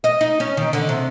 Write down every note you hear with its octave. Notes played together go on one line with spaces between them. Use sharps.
D#5
D#4
C#4
D#3
D3
C3